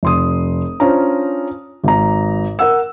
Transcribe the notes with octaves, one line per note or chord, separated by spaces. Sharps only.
F1 C6 D#6
C#4 D4 F4 C5 A#5
G#1 A#5
A#4 F#5 E6